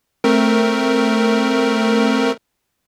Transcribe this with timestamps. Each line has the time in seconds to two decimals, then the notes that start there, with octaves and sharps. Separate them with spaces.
0.24 A3 C4 A#4